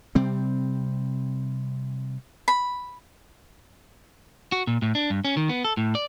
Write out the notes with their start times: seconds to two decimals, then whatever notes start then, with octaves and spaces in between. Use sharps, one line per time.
0.15 C3 G3 C4
2.48 B5
4.52 F#4
4.67 A#2
4.82 A2
4.95 D4
5.10 G2
5.25 C#4
5.37 D#3
5.49 B3
5.65 A4
5.77 A2
5.95 D5